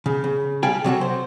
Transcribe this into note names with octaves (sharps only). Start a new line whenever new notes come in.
C#3
C#3
G3 G#4 F5 G5 A5
C3 F#3 F#4 A4
C5